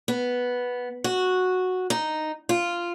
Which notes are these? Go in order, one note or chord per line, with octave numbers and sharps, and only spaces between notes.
B3
F#4
D#4
F4